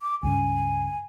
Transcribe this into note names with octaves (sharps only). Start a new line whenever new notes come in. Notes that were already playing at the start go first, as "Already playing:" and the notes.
D6
C#2 G2 C#3 G#5